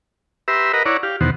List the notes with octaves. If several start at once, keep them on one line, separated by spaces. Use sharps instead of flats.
G4 B4 E5 A#5 C6 E6
A#4 B4 D#5 F#5 A#5
E4 C#5 D5 F#5 A#5
G4 F5
E2 B2 D#3 C5 F#5